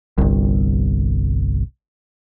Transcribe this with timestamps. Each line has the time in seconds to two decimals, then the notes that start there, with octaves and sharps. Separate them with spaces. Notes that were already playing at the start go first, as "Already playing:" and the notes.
0.18 G1 C2